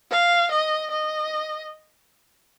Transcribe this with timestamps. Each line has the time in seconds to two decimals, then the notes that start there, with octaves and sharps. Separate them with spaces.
0.11 F5
0.51 D#5
0.90 D#5